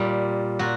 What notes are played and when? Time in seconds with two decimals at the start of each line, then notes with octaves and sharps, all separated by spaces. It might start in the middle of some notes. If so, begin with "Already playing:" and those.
Already playing: A#2 G3
0.59 A#2 F#4